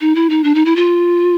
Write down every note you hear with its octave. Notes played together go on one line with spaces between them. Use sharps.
D#4
E4
D#4
D4
D#4
E4
F4